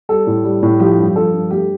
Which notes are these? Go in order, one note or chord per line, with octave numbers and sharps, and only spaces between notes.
G3 A4
A2
G3
A2
F3 G4
G2
F3 A4
G2
A3 G4